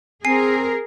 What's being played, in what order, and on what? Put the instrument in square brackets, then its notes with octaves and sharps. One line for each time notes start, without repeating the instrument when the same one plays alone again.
[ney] C4 [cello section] G#4 A#4 [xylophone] G#5 C7